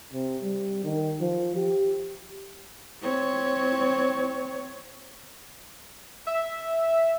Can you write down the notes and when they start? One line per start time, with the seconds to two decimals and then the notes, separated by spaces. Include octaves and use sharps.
0.13 C3
0.42 G3
0.84 D#3
1.20 F3
1.56 G4
3.02 C4 C#5
6.27 E5